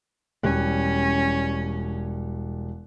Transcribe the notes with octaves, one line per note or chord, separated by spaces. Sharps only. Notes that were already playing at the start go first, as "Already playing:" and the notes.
E1 G3 C#4 F#6